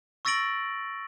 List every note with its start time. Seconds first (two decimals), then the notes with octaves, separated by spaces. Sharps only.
0.25 C#6 E6 A6 A#6 D7 F#7